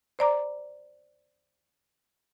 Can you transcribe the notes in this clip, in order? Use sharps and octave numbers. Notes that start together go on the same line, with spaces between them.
C5 D5 A#5 D6